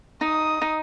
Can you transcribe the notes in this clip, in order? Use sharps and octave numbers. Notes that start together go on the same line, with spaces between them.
D#4 D#6
D#4